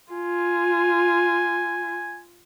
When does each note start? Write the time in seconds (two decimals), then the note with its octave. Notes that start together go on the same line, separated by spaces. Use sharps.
0.12 F4 G#5